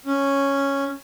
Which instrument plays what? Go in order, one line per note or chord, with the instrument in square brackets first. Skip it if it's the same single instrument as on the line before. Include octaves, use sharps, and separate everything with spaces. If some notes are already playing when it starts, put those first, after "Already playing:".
[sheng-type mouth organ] C#4